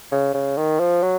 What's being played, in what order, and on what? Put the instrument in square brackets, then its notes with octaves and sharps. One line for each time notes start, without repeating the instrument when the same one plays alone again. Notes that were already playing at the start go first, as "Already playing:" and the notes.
[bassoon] C#3
C#3
D#3
F3
F#3